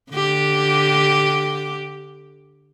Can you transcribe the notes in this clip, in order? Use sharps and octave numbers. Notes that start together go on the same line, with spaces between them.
D3 G4